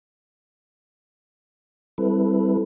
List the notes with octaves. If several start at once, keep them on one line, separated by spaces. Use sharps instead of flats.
G3 C4 E4 A4 B4